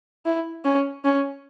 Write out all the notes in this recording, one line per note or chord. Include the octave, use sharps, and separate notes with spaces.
E4
C#4
C#4